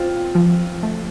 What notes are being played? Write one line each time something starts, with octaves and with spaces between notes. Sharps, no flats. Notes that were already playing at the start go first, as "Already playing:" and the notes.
Already playing: C4 F4
F3
A3